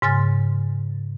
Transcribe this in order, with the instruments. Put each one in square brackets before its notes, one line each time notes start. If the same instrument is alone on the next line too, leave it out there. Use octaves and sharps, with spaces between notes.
[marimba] G#2 C#3 G#5 C6 F6 A6